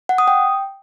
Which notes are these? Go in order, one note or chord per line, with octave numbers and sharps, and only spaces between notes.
F#5
D#6
G5